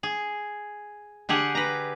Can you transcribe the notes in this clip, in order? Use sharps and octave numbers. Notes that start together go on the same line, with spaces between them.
G#4
D3 G4 G#4 F#5
B4 A#5